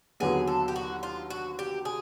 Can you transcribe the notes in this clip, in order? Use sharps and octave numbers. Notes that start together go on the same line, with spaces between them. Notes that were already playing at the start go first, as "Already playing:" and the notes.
D#2 D3 F#3 B3 G#4
A4
G4
F#4
F4
F#4
G4
G#4